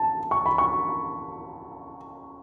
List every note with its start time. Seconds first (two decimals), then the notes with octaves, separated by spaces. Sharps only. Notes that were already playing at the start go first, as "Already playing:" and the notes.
Already playing: A5
0.31 C#6
0.46 B5
0.58 C#6